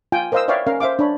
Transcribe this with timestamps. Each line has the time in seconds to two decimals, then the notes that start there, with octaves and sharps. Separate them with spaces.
0.12 F4 G5 G#5
0.32 A#4 C5 D#5 F5 D#6 E6
0.48 B4 C#5 D5 E5 F5 G5
0.67 C#4 A#4 F5
0.80 C5 E5 F5 D6
0.99 D4 C#5 B5